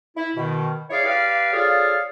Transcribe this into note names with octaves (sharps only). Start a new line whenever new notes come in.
E4
B2 D#3
E4 G#4 C#5 D5 F5
G4 B4 D5 F5
F4 G#4 A4 C#5 D5 F5